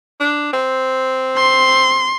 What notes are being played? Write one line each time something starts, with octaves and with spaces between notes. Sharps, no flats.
D4
C4
C6